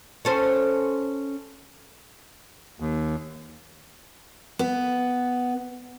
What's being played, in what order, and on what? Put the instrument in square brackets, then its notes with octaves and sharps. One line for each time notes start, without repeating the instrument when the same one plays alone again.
[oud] C#4 A4 C5
[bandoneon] D#2
[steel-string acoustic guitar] B3